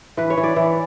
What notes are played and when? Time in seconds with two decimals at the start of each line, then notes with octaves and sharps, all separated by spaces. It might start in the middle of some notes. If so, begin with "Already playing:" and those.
0.17 E3 B4
0.30 C#5
0.37 E3
0.43 D5
0.56 E3